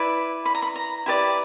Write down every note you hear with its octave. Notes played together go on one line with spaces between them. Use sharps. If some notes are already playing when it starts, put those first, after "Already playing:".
Already playing: E4 B4 D5
B5
A#5
B5
A#5
E4 G4 B4 D5